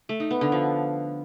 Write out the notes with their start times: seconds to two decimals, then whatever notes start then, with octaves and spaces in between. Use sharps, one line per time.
0.09 A3
0.20 D#4
0.31 B3
0.41 D3
0.52 F3